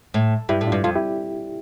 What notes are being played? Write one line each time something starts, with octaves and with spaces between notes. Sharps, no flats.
A2
G2 E4 G4
A2
D4 F4
G2
F2 F4 A4
E4 G4